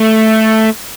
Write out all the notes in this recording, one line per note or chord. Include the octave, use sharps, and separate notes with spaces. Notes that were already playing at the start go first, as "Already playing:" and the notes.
Already playing: A3